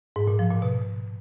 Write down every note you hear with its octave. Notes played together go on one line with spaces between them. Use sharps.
G#2
A#2
F3
A#2
B2